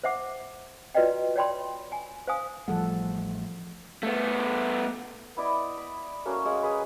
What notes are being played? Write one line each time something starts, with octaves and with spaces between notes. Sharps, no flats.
C5 E5 F#5 D6
F4 F#4 B4 D5 D#5 G5
C#5 D5 G5 B5 C6
G#5
C5 F5 G#5 D#6
A1 F3 G3 A3 A4 F#5
A3 B3
B3 E4 D5 D#5
B5
A3 A#3 C#4 F#4
G#3 C#5 F5 F#5
G#4 B4